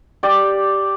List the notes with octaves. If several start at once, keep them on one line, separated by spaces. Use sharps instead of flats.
G4 D5 G5